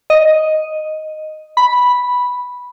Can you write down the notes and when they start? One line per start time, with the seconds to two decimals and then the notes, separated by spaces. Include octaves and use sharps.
0.10 D#5
1.57 B5